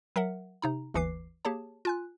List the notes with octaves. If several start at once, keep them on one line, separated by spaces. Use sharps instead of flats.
F#3 A#4 E5 F#5
C3 D#4 A#5
G1 D#2 E3 B4 D6 C7
A#3 G4 G#4 C#5 A5
F4 G#5 F#6